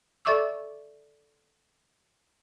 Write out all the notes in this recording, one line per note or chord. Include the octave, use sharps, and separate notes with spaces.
A4 D5 E5 C#6 D6 E6